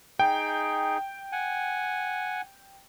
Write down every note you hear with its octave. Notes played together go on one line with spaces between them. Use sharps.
D#4 G#4 G5
F#5 G#5